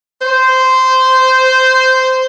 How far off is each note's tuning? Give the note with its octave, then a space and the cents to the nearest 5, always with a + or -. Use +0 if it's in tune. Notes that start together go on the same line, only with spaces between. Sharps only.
C5 -10